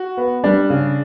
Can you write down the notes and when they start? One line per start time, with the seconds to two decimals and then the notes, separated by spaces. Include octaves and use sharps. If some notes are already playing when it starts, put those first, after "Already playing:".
Already playing: F#4
0.17 B3
0.44 G3 D4
0.70 C#3